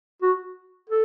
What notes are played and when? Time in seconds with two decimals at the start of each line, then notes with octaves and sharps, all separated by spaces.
0.22 F#4
0.90 A4